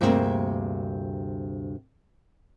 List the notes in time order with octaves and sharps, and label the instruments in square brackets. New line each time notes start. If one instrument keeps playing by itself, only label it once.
[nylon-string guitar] D2 G2 C3 A#3 C4 G#4